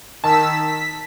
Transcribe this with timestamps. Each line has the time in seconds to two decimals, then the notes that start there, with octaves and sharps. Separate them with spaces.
0.24 D#3 A5 E6 B6
0.68 B6